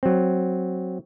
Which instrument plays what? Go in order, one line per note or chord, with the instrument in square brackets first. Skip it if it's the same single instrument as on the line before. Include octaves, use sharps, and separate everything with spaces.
[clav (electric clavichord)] F#3 C4